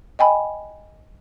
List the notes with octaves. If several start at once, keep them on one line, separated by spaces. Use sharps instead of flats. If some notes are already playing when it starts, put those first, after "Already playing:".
D#5 G5 G#5 B5